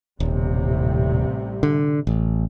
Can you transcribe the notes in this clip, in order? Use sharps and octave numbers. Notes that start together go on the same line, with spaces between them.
D#1 A1 C3 G3
D3
A1